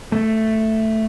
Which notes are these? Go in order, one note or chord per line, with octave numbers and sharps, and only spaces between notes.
A3